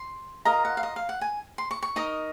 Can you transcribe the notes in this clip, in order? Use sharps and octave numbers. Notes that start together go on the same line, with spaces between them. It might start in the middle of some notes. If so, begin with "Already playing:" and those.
Already playing: C6
F4 A#4 D#5 A#5
F#5
F5
D#5
F5
F#5
G#5
C6
C#6
C#6
D#4 A#4 D#5